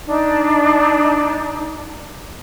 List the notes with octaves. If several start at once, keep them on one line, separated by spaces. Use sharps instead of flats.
D4 D#4